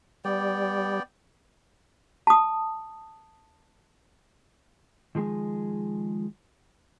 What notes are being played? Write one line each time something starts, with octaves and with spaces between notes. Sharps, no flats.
G3 B3 D5 G5
A5 D#6
D#3 F3 G#3 G#4